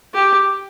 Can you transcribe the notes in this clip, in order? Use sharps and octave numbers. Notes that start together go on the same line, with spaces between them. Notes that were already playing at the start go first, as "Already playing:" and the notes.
G4